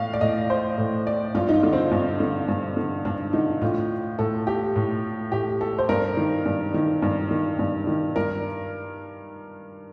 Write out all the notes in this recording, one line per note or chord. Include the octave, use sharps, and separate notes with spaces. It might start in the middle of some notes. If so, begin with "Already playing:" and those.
Already playing: A2 F5
D5
A2 D#5
C5
A2
D5
G2 F4
D#4
F4
D3
C4
G2
D3
G2
D3
G2 D4
D3 D#4
A2 F4
A2 A4
G4
A2
A2 G4
A4
C5
G2 A#4
D#3
G2
D#3
G2
D#3
G2
D#3
G2 A#4